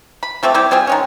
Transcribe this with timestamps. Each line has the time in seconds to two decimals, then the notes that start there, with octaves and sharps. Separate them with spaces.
0.23 B5
0.43 F3 A3 C4 G4
0.54 G3 C4 E4 G4
0.71 G3 C4 F4 G#4
0.87 D#3 G#3 C#4